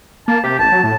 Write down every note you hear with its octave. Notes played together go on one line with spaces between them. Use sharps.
A#3 A5
C3 G4
A1 A5
F#3
A2 A5